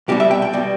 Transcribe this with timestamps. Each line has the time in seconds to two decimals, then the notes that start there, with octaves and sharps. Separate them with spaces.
0.08 C2 B2 G3 G4
0.20 E5
0.31 G5
0.42 G5
0.53 B2 G3